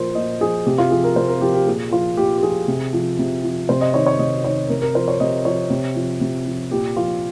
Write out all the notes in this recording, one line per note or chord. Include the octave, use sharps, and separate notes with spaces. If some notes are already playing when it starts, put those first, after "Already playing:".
Already playing: A#2 F3 A#4 C5
A#2 D#5
F3 G#4
C3 G4
F4
F3 G#4
A#4
C3 C5
A#4
F3 G4
G4
A#2 G#4
F3 F4
A#2 G4
G4
F3 G#4
C3
F3
C3
F3
C3 C5
D#5
D#3 C#5
C#5
C3 D#5
D#3 C#5
C3 A#4
A#4
F3 C5
C#5
C3 D#5
F3 C#5
C3
F3
C3
F3
A#2 G4
F3 F4